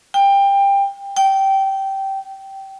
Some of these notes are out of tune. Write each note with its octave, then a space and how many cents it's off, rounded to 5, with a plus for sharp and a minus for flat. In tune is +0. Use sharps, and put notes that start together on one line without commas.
G5 +20
G5 -15